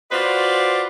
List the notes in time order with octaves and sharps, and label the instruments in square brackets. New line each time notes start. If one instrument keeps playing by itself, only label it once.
[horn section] F4 F#4 B4 C5 D5